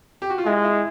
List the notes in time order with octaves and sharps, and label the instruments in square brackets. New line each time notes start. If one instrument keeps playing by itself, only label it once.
[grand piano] G4
F#4
F4
[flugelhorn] G#3 [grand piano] E4
[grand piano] E4